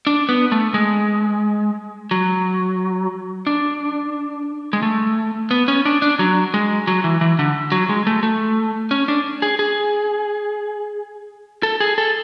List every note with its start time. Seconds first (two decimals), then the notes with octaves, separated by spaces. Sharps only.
0.07 D4
0.29 B3
0.52 A3
0.74 G#3
2.11 F#3
3.47 D4
4.73 G#3
4.83 A3
5.51 B3
5.68 C#4
5.85 D4
6.02 D4
6.19 F#3
6.54 G#3
6.87 F#3
7.04 E3
7.21 E3
7.39 D3
7.72 F#3
7.89 G#3
8.07 A3
8.23 A3
8.91 C#4
9.08 D4
9.42 G#4
9.59 G#4
11.63 A4
11.80 G#4
11.98 A4